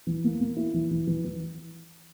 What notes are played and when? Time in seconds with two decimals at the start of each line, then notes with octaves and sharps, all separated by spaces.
0.07 E3
0.24 A#3
0.41 A#3
0.57 E4
0.74 E3
0.91 E3
1.07 E3
1.24 E3